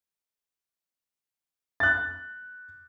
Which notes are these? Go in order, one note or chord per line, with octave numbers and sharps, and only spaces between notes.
F#6 A6